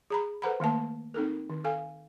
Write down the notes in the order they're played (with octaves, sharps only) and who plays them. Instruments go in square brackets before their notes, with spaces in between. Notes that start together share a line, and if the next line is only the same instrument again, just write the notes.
[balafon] G#4 A#5 B5
A4 B4 C5 F#5 A#5 B5
D#3 A3 A#3 A5
C4 D#4 A4 A#4
D#3
A4 F5 G#5